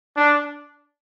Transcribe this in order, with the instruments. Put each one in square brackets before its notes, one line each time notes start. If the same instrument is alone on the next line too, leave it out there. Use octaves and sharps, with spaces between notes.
[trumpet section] D4